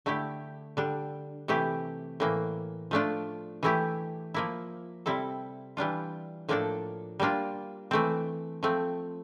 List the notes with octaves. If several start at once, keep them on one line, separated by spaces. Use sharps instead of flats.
D3 A3 E4 G4
D3 G3 D4
C3 E3 A3 E4 G4
A2 E3 A#3
F3 A3 D4 F4
E3 A3 E4 G4
F3 A#3 E4
C3 G3 C4 E4 A4
E3 G3 D4 F4
A2 F3 A#3 D4 A4
G3 A#3 D4 F4
E3 A3 C4
F3 A3 C4